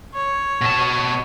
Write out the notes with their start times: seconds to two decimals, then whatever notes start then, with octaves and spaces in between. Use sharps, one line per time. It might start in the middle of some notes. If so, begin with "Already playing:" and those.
0.14 C#5
0.61 B2 A5